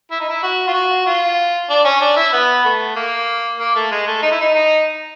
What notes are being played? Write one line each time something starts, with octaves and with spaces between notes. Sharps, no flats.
E4
D#4
E4
F#4
F4
F#4
F4
D4
C#4
D4
E4
B3
A3
A#3
A#3
A3
G#3
A3
D#4
E4
D#4
D#4